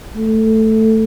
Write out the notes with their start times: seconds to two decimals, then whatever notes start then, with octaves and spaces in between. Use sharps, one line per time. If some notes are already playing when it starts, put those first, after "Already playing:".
0.16 A3